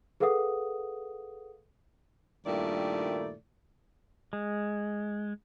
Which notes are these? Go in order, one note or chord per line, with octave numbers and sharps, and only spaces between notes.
G#4 A4 B4 F5 F#5 D#6
G2 A#2 D#3 A3 E4 D5
G#3